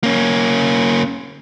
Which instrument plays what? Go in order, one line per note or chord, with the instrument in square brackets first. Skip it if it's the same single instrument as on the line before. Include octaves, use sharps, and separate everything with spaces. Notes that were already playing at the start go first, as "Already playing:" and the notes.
[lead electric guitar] A#3 C#4